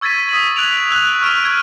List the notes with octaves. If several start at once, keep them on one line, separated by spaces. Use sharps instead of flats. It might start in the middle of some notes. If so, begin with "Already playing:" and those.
C#6 E6 G#6 A6 B6 D#7
D#6 B6 F#7
F#6 G#6 D7 F7
E6 F#6
C#6 F6 D7 E7
E6 G#6 D#7